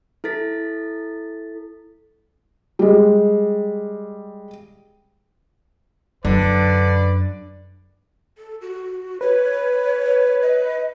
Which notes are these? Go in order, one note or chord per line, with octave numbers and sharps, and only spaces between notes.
E4 A4 A6 B6
G3 G#3
F#2 D3 B4 D5
A4
F#4
B4 C#5
D#5